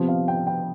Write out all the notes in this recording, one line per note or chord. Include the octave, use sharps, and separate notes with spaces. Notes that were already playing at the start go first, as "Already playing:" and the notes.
Already playing: C3 F3 B3
F5
G5
G5